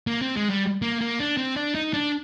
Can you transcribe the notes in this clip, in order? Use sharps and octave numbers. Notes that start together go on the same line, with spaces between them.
A#3
C4
G#3
G3
A#3
A#3
D4
C4
D4
D#4
D4